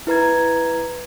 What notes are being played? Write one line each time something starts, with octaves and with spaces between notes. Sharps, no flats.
E4 B4 A#5 G#6